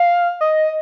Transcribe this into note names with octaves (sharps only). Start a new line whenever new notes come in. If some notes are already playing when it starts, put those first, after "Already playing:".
Already playing: F5
D#5